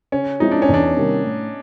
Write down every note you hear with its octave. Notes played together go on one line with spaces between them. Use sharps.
C#3 C#4
F3 G#3 C4 D#4 E4
D4
C#4
E2
D4
C3 D#3 G3 A#3
A2